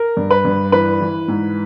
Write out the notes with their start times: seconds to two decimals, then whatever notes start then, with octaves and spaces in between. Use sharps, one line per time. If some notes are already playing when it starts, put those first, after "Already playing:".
Already playing: A#4
0.17 G2
0.31 B4
0.45 G2
0.72 E3 B4
1.01 E3
1.28 G#2